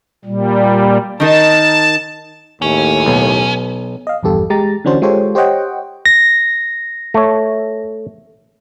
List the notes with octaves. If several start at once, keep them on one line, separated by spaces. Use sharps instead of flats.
A#2 G3
D#3 D#4 A#4 A5
D#2 A2 C#4
B1
D#5 F5
A#1 E2 G2 G4 A4
G#3 G4 A#5 A6
D3 E3 C#4 D4 F#4 C5
G#3 F4 G4 A4 C5 C#5
G4 C5 C#5 D#5 F#5 G5
A#6
A3 C#5